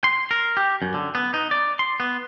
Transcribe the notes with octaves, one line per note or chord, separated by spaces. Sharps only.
C6
A#4
G4
F#2
D3
B3
D#4
D5
C6
B3